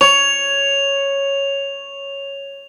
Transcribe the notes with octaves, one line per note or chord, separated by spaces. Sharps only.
C#5 F7